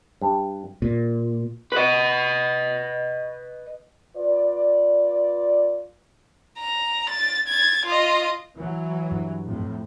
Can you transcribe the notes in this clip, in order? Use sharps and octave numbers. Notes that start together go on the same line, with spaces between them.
G2
A#2
B4 D#5
F4 B4 D5
A#5
A6
G#6 A6
F4 D#5
E3 F#3
G2
F2 A2